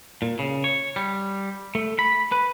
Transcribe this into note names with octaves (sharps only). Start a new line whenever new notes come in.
A#2
C#3
C#5
G3
A3
B5
B4